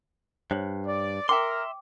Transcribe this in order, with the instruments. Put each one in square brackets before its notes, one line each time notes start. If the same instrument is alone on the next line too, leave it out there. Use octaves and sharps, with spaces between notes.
[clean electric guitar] G2 [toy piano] C5 C#5
[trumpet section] D5
[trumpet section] A#4 [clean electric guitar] E5 C6 [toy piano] G5 D6